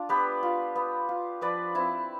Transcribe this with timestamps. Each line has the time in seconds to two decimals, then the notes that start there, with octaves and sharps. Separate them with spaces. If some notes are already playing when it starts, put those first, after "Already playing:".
Already playing: D4 F4
0.09 B3 G4 B4
0.43 F4
0.76 B3
1.09 F4
1.41 F3 B4 D5
1.75 C4 E4